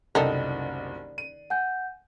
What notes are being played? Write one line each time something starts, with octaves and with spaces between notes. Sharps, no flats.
F#1 C2 D#3 A4 A#4 D5
D#7
F#5 G#5 G6